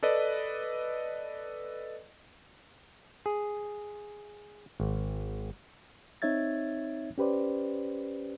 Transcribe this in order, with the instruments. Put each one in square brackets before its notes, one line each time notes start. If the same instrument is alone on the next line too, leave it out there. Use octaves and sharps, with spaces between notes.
[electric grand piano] A4 B4 D5 D#5
[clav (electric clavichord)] G#4
G#1
[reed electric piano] C4 D#4 C#5 E5 G#6 A6
C#4 G4 B4 C5 D5